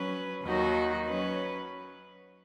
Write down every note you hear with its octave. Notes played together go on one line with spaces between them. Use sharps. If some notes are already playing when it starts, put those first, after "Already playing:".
Already playing: F#3 C#4 B4
D#2 D#3 F#3 D#4 F#4
F#3 C#4 B4